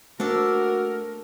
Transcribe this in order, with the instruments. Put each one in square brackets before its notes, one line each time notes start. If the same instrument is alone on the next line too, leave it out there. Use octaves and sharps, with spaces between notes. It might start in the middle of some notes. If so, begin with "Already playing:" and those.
[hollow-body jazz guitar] A3 A#3 C5 [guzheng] D4 A4 [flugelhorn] F#4 [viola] A#4